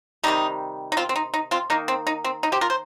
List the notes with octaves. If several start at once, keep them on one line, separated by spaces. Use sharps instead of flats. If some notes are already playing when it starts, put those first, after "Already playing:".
C3 D#3 G3 D#4
D#4
C4 F4
C4
D#4
D#4
C4 F4
D#3 A#3 D#4
C4
D#4
C4
D#4
G4 C5
F4 A#4
C5